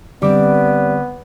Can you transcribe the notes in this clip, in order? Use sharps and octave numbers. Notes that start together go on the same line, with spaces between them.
D3 G3 B3 C4 D5 D6